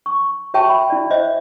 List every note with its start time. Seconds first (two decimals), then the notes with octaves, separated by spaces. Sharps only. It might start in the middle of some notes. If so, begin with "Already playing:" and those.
0.06 C#6
0.54 F#4 C#5 E5 G5 A5 C#6
0.69 B5
0.90 E4 D5
1.11 C5 C#5 D#5 E5